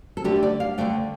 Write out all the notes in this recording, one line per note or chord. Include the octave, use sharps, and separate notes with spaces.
A4
D3 A3 D4 G4
D5
F5
D3 A3 D4 G5